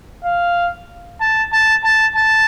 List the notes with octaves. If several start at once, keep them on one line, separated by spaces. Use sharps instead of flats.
F5
A5
A5
A5
A5